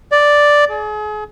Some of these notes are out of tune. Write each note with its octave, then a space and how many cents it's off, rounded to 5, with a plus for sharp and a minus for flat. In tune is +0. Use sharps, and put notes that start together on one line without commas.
D5 +0
G#4 +35